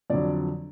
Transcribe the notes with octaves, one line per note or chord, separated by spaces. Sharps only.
F2 D3 F#3 D5